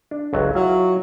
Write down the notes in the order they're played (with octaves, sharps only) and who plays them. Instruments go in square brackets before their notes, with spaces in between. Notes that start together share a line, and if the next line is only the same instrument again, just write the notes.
[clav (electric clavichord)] D4
G1 C#2 F#3
[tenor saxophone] F#3 [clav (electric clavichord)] E4 F4